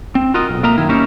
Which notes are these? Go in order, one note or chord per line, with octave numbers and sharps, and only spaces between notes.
C4
F4 F#4 A#4 D#5
B1
A#3 A#4 D#5 E5 A#5
F#2 D#3 E4
G3 A#3 C#4 D#4 E4